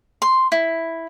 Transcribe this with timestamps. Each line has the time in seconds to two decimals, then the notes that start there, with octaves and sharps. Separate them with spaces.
0.22 C6
0.52 E4